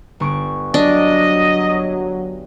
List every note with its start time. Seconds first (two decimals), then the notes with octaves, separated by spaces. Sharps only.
0.20 G1 C#6 D7
0.74 F#3 D4 D#5